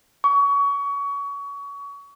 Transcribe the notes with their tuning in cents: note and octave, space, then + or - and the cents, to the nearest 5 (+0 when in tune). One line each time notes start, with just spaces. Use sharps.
C#6 +30